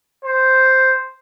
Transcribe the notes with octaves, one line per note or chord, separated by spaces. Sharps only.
C5